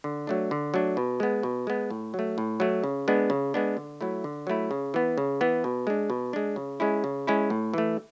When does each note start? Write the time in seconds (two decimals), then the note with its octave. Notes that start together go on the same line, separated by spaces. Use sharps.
0.04 D3
0.27 F#3 A3 D4
0.51 D3
0.74 F#3 A3 D4
0.97 B2
1.20 G#3 B3
1.43 B2
1.67 G#3 B3
1.90 A2
2.14 F#3
2.19 A3
2.38 A2
2.60 F#3 A3
2.84 C#3
3.08 G#3 B3 D4
3.30 C#3
3.54 G#3 B3 D4
3.77 D3
4.01 F#3 A3 E4
4.24 D3
4.47 F#3 A3 E4
4.71 C#3
4.94 E3 B3
5.18 C#3
5.41 E3 B3
5.64 B2
5.87 G#3 D4
6.10 B2
6.33 G#3 D4
6.56 C#3
6.80 G#3 C#4 E4
7.04 C#3
7.27 G#3 C#4 E4
7.50 A2
7.74 E3 A3